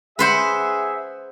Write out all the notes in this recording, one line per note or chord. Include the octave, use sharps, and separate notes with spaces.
G#4 B4 C5 E5 F#5